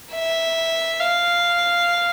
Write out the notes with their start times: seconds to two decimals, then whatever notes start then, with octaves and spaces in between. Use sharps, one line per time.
0.13 E5
1.00 F5